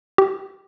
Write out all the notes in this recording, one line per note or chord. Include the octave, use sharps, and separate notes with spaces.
G4